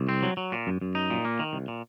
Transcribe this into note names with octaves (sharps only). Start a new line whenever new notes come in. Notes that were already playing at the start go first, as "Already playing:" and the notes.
Already playing: C2
C4
F#3
F#3
A#2
F#2
F#2
D#4
A#2
A#3
D#3
C2
A#2